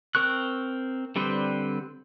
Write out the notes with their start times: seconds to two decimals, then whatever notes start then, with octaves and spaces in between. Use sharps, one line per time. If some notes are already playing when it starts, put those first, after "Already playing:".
0.15 C4 A#4 C#6 F#6
1.16 D3 G3 C4 B4 C5